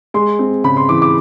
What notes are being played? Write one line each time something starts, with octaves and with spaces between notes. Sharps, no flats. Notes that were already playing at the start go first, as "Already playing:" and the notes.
G#3 C6
C4
C#3 B5
C6
E3 D6
D6